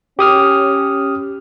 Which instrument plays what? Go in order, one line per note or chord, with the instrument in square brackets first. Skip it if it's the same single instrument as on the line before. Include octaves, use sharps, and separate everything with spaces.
[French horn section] C#4 [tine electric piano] G4 D#6 F6